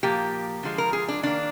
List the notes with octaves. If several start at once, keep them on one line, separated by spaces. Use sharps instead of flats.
A#2 F3 A#3 G4
D3 F3 G#3
A#4
G#4
D4
D#3 A#3 D4